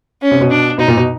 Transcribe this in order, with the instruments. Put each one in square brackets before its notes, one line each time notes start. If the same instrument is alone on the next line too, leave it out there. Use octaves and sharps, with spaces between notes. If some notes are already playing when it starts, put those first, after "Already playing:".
[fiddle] C#4
[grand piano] C3
B2
[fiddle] D4
[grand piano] B2 [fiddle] D#4
[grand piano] A#2
B2